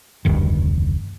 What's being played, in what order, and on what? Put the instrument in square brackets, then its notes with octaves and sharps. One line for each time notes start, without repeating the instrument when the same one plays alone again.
[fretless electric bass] F1 D2 G2 D#3